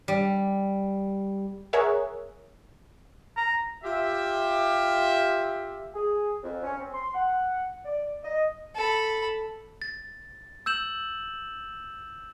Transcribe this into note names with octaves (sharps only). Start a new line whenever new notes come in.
G3
G#4 A#4 C#5 E5 F#5
A#5
F4 G4 E5
G#4
F2
C#4
C4
C6
F#5
D5
D#5
A4 B5
A6
E6 G6 E7 F#7